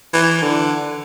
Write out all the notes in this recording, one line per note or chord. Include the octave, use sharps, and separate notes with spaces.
E3
D3